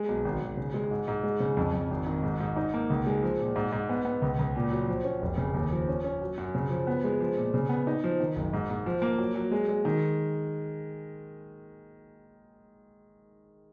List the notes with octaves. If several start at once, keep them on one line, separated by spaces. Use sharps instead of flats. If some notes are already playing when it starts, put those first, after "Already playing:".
Already playing: G#3
B1
G#1
G#1
C#3
G#3
G#2
G#2
G#3
C#3
F2
F2
G#1
D#3
G#2
G#2
D#4
A#3
C#2
G#3
F3
A#2
G#2
G#2
B3
B3
C#2
C#2
A#2
F#3
F3
C#4
F1
C#3
D#2
F3
C#4
C#4
F#3
F#2
C#3
F3
B3
G#3
F3
A#2
C#3
B3
D#4
F3
D#3
F#1
G#2
G#2
F3
A#3
F#3
F#3
G#3
G#3
D#3